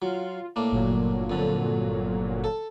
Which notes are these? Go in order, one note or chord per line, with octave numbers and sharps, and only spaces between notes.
F#3 F4
A2 A#3 D4
G1 A#2 F#3
F2 D3
A4